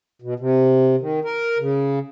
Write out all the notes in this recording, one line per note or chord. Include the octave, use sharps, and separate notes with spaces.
B2
C3
D#3
A#4
C#3